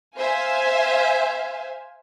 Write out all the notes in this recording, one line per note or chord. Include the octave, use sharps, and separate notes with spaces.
C5 E5 F5 G#5